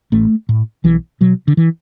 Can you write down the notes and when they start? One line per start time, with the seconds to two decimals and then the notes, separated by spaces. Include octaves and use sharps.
0.12 A1 A3
0.49 A2
0.84 B1 E3
1.21 B2 F#3
1.48 D3
1.57 E3